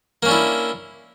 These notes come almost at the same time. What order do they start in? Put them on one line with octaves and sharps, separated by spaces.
A#3 C#4 D4 E4